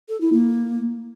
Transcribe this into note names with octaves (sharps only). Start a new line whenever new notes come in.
A4
E4
A#3